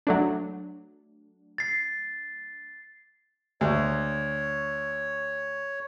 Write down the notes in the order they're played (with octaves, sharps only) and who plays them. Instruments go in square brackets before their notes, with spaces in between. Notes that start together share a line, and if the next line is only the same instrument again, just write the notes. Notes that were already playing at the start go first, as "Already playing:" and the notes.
[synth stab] F#3 A3 D4
[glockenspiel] A6 C7
[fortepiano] D2 [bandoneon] C#5